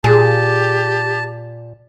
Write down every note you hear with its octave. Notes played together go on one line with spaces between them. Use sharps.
A#2 G4 G#4 A5